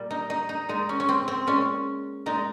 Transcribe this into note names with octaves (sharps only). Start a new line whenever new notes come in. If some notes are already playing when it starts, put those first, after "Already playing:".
Already playing: A#2 G3
D#4
D#4
D#4
A#2 G#3 D#4
C#4
C#4
C4
C4
A#2 G#3 C#4
A#2 G#3 D#4